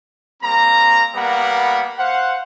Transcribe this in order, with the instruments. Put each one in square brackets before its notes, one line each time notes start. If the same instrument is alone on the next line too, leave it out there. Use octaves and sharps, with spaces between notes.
[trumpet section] G3 A#3 C4 A#5
G3 A#3 B3 F#5 B5
C5 F5 F#5